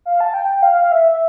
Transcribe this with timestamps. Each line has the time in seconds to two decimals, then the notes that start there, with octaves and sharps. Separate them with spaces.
0.05 F5
0.21 A5
0.34 G5
0.49 G5
0.62 F5
0.92 E5